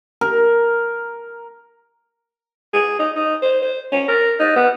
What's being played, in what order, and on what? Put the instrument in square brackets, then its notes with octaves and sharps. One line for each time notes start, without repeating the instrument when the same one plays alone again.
[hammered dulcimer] A#4
[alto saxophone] G#4
D#4
D#4
C5
C5
C#4
A#4
D#4
B3